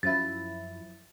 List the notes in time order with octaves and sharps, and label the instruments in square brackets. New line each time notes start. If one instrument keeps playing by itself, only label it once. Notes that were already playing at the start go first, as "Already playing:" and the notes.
[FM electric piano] F#2 F3 E4 [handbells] A6